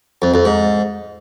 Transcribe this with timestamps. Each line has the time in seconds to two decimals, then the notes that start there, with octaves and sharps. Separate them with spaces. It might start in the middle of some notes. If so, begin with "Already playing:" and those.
0.22 F2
0.34 F2
0.45 G#2